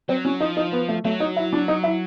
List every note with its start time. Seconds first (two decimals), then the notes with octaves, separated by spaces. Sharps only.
0.09 F#3 C4
0.25 C#4
0.40 F3 D#4
0.57 D#4
0.72 B3
0.89 A3
1.05 F#3 A3
1.20 D#4
1.37 E4
1.53 D4
1.68 D#4
1.84 E4